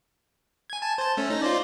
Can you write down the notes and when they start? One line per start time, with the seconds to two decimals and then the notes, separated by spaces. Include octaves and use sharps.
0.70 G#5 G#6
0.82 G#5 A5
0.98 C5 A5
1.17 A3 C#4
1.30 D#4 A#6
1.42 F4 C5 D5